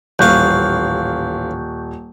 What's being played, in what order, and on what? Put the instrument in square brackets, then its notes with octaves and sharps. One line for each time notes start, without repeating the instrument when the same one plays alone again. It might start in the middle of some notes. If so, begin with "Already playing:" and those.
[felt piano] D#1 [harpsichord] A1 F5 [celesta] C#6 F#6 G6